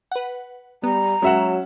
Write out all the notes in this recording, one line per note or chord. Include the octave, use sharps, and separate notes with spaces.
B4 F#5
G3 B3 A#5
F#3 G#3 C#4 F#4 E5 F#5 E7